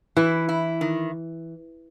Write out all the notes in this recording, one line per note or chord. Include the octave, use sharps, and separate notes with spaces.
E3 E4
E4
D#3